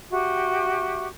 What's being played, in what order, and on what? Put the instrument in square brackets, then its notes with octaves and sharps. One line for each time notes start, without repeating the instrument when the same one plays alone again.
[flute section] F#4 G4 E5